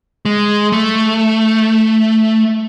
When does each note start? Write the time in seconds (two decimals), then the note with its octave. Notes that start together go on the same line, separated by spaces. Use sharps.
0.25 G#3
0.72 A3